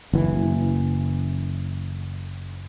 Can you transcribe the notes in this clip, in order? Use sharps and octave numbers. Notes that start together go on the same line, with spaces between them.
F#1 E3